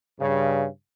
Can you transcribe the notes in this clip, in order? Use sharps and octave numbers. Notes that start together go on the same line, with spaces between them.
G2 C#3